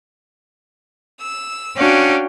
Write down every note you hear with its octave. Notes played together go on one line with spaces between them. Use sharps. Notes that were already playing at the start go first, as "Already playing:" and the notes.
E6
C#4 D4 F#4 F5 G5